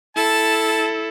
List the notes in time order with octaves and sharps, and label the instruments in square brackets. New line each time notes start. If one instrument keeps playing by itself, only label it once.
[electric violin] E4 A4 [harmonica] A5